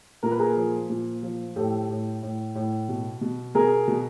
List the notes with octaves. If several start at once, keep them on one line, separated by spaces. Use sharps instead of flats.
A#2 A#4
B4
G#4 A#4
F3
A#2
F3
A2 G4 A4
A2
A2
A2
B2
B2
B2 G#4 A#4
B2